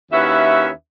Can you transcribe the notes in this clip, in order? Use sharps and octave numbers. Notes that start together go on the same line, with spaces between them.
D#2 C#4 E4 F#4 B4 E5